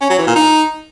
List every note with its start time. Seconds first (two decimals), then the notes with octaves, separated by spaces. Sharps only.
0.01 C#4
0.10 F#3
0.18 E3
0.27 A#2
0.36 D#4